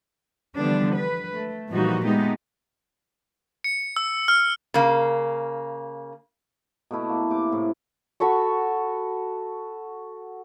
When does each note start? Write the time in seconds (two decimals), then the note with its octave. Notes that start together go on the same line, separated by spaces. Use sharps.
0.56 D3 E3 F3 G3 B3 D4
0.95 B4
1.32 A3
1.70 A#2 E3 F3 G3 D#4 F#4
2.05 G#3 A3 B3 D#4 G4
3.64 C#7
3.96 E6
4.28 F6
4.74 C#3 A#3
6.91 B2 A3 E4
7.09 A#3
7.30 C3 D6
7.52 A2
8.20 F#4 A4 B5 C#6